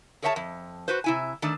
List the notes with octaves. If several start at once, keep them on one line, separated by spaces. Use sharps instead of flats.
G#4 A#4 C#5 E5 G5 A5
F2
F#4 B4 C5
C3 E4 G#5
D#3 A3 D4